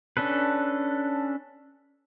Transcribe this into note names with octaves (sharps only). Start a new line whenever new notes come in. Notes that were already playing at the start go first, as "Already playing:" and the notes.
C#4 D4 A4 B4